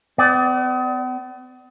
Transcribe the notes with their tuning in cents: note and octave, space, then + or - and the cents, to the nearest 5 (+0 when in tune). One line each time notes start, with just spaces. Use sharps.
B3 +45 D5 +0